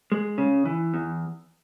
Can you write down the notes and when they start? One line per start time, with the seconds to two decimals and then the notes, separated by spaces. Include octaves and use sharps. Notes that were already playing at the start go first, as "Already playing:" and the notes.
0.12 G#3
0.38 C#3
0.65 E3
0.94 E2